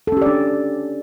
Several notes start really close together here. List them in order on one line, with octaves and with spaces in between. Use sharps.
A4 C#4 G4 D5 D4